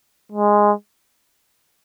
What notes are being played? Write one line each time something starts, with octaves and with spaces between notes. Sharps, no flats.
G#3